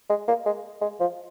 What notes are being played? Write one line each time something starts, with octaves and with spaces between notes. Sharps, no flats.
G#3
A#3
G#3
G#3
F3